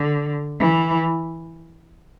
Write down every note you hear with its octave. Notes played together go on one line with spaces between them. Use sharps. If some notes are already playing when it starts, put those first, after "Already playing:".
Already playing: D3
E3